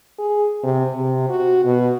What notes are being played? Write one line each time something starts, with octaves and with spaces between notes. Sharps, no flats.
G#4
C3
C3
F#4
B2